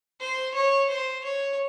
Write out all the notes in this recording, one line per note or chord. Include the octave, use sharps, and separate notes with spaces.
C5
C#5
C5
C#5